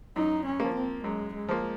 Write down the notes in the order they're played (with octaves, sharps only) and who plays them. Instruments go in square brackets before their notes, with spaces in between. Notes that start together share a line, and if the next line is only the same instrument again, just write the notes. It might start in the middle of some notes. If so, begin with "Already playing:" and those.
[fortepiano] F#2 [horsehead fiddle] D#4
[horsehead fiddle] C#4
[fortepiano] F3 A#3
[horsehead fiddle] C4
[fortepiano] F#2 [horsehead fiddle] G#3
[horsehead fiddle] G#3
[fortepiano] F3 A#3